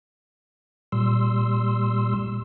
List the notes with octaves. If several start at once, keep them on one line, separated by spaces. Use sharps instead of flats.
A#2 G3 C6 E6